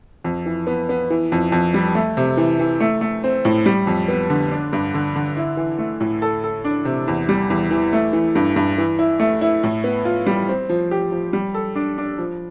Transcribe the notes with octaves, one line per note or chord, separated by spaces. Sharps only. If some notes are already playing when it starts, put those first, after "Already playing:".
F2
E3
B3
B3
E3
F2
F2
G3
A3
C3
E3
E3
A3
A3
C4
A2
G3
F2
B3
D3
D4
G2
D3
D3
E4
E3
A3
A2
A4
A4
D4
C3
E2
G3
E2
E3
A3
E3
G2
G2
E3
E4
A3
E4
A2
B3
F4
G3
C4
F3
G4
F3
G3
A4
D4
D4
F3